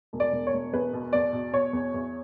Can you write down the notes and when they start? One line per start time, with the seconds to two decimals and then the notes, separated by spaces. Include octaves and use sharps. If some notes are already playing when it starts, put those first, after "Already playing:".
0.13 E1
0.20 D5
0.32 E1
0.47 C#5
0.53 E1
0.73 E2 B4
0.93 B2
1.13 E2 D5
1.33 B2
1.53 B2 C#5
1.73 E2
1.94 E2